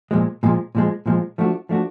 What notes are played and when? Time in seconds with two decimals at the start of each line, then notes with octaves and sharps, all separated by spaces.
0.11 A#2 F3 G#3
0.43 A#2 F3 G#3
0.75 A#2 F3 G#3
1.06 A#2 F3 G#3
1.38 F3 A3 D4 F#4
1.69 F3 A3 D4 F#4